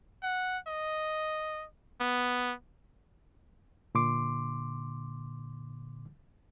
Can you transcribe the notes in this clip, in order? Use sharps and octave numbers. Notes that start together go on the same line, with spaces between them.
F#5
D#5
B3
A#2 D3 C6 D6